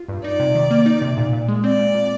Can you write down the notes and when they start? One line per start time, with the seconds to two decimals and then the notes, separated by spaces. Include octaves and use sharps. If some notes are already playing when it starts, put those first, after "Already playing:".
Already playing: F4
0.09 G2
0.24 D#4 D5
0.40 C3
0.55 D#3
0.71 A#3
0.86 D#4
1.02 C3
1.17 A#2
1.33 A#2
1.48 G#3
1.64 C4 D5
1.79 A#2
1.95 A#2